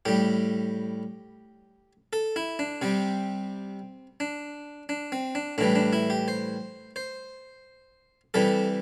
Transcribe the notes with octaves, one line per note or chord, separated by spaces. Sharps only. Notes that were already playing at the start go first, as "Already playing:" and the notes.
A2 G3 G4
A4
E4
D4
C3 G3 C4
D4
D4
C4
D4
A2 E3 G3 D4
D4
E4
G4
C5
C5
C3 E3 G3 A4